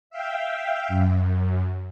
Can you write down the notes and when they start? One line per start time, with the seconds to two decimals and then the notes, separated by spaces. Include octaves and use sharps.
0.10 E5 F5 G5
0.88 F#2